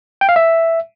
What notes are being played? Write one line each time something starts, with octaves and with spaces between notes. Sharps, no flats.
G5
F5
E5